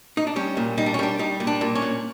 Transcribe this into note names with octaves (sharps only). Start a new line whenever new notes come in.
D#4
D4
G3 C#4
A#2
G3 D#4
D4
C#4
G3 D4
G3 D#4
A#2
D4
A#2
C#4
A#2